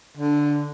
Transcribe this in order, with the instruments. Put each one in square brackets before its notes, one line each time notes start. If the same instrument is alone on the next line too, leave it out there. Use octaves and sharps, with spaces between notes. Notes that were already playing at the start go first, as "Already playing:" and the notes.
[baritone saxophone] D3